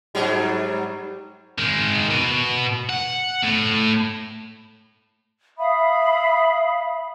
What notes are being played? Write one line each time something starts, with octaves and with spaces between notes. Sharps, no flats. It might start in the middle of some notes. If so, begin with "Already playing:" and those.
G#2 F#3 G3
D#3 G#3
B2
F#5
A2
E5 F5 B5 D#6